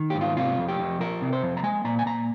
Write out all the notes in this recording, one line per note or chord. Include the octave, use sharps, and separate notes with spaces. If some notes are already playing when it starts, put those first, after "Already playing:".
Already playing: D#3
G#2 G4
F4
C3 F4
F2
G4
F2
F3 A#4
C3
C5
F2
A#5
G#3 G#5
A#2 A#5
G#5
A#2 A#5